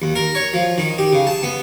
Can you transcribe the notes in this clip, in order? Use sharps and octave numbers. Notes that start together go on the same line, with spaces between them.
D#2
A#4
C#5
F3
D#3
G4
C#3
A5
B3